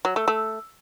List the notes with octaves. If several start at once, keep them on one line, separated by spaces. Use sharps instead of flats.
F#3
A3
A3